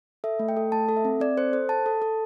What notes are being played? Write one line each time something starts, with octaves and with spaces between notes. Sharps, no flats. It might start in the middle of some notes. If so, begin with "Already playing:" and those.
A4 E5
A3
G5
A4
A3 A5
A4
E5
C4
C4 D5
A4 C5
A4 C5
A4 A5
A4
A4